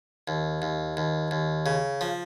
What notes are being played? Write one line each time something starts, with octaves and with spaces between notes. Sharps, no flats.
D#2
D#2
D#2
D#2
C#3
F3